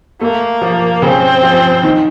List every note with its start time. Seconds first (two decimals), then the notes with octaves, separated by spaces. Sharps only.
0.21 A3 A#3
0.62 F3
1.02 C#3 C4
1.43 F3
1.83 D#3